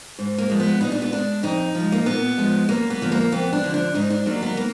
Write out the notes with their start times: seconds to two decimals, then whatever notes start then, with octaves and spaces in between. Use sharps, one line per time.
0.19 G#2
0.38 A#3
0.50 F3 G#3
0.60 B3
0.81 A#2 D#4
0.92 D4
1.02 B3
1.12 G#3 D4
1.43 F2 D#4
1.75 F3
1.80 G#3
1.92 A#3
2.06 A#2 B3
2.38 F3 G#3
2.69 F#2 A#3
2.90 B3
3.01 D3 F3 A#3
3.12 A#3
3.32 F2 B3
3.53 D4
3.64 D3 F3
3.74 D4
3.95 G#2 D#4
4.10 D4
4.26 D#3 F#3 A#3 D4
4.43 B3
4.57 A#3